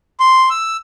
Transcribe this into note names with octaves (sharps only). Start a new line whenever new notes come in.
C6
E6